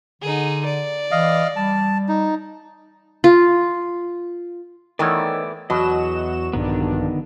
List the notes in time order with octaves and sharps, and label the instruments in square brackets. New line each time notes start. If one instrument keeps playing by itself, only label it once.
[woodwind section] D3 [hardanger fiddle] D#4 G#4
[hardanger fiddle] D5
[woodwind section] E3 [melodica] D#5 F5
[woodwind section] G3 [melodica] A5
[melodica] D#4
[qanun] F4
[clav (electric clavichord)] D#3 C#5 [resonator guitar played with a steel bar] E3 A3 B3 [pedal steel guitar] D5
[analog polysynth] E2 F#4 E7 [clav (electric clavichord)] B2 [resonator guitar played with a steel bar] F#3 [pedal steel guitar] D#5
[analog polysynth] A#1 G2 D4 [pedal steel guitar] D3 D#3 B3